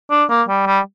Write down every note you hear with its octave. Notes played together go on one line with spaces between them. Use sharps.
D4
A#3
G3
G3